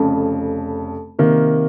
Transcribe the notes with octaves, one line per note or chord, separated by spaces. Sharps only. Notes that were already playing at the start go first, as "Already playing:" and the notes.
Already playing: F1 F2 C#3
C3 D#3 A#3